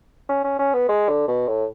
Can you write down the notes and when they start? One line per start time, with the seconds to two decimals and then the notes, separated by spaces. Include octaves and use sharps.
0.29 C#4
0.44 C#4
0.59 C#4
0.74 B3
0.89 G#3
1.09 D3
1.28 B2
1.48 A2